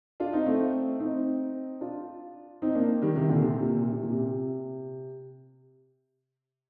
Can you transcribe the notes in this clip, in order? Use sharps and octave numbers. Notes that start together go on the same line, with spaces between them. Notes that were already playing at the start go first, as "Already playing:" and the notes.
D4 F4
C4 D#4
A3 C4
C4 D#4
D4 F4
C4 D#4
A#3 D4
D#3 G3
C3 D#3
A#2 D3
C3
A#2
C3
C3
A#2
C3